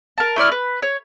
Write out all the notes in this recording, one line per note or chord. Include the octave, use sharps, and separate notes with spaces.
A#4 A5
A3 E4 D5 F6
B4
C#5